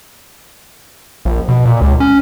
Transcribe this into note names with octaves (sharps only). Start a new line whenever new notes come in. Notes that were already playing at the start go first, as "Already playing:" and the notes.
A#1
B2
A#2
C#2
C#4